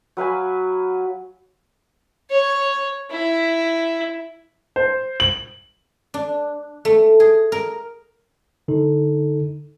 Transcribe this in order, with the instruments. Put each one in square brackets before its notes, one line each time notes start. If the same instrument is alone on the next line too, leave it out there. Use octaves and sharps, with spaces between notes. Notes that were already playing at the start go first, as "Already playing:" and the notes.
[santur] F#3 B4 F5 G#5
[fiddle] C#5
E4
[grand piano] C5
F#7
[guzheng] D4
A3
G#4
A#4
[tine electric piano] D3 D#4 A4